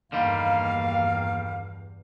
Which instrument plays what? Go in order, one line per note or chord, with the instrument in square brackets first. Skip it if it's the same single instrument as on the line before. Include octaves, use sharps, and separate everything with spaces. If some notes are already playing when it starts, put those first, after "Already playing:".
[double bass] E2 G2 [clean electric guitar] D3 D#3 G3 [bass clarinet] A#3 [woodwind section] F5